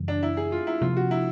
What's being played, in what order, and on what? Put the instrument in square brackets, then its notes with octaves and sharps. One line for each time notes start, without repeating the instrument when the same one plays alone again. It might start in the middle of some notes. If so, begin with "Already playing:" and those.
Already playing: [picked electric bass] F#2 C#3 E3 G3
[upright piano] D4
E4
G#4
F4
E4
[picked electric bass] C3 F3 A#3 [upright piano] F4
[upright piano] F#4
E4